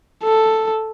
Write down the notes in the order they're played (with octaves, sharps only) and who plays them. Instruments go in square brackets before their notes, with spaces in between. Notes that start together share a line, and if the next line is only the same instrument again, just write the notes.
[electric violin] A4